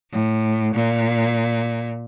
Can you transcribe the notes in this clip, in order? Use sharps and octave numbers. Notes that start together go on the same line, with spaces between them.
A2
A#2